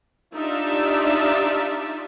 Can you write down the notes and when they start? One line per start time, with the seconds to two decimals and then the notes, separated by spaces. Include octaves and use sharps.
0.34 D4 D#4 F4 G4 D5 E5